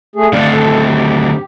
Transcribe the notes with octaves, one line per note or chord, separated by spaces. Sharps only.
A3 G#4
D3 A3 C4 D5 F5
A4
G4